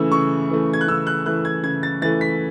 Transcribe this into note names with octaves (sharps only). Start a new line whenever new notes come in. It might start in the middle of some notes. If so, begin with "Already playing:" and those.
Already playing: C#3 E3 A3 E6
C#3 C#6
E3 A3
G#6
F#6
C#3 E6
F#6
E3 A3 F#6
G#6
C#3 G#6
A6
E3 A3 A6
B6